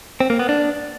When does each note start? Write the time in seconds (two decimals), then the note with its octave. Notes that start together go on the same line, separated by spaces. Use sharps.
0.20 C4
0.30 A#3
0.39 B3
0.49 D4